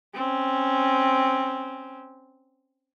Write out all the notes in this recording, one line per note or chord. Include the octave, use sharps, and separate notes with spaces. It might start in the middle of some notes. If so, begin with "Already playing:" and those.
C4 C#4